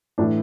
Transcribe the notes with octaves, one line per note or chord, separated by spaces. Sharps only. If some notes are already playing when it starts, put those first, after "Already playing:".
A2 E3 D4